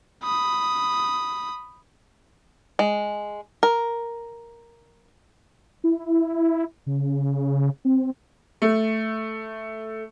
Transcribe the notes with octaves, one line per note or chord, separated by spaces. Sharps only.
B5 D#6
G#3
A#4
E4
C#3
C4
A3